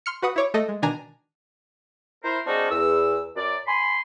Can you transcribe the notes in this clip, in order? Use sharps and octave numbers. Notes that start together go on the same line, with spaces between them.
C6 F6 C#7
F#4 B4 F#5 D#6
E4 C#5 D6
A3 A4 D#5
G#3
B2 D#3 D4 G#5 A#5
E4 A#4 C5
G#3 C4 D4 D#4 F4 F#4
E2 E6
F#2 D5
G#5 B5 C6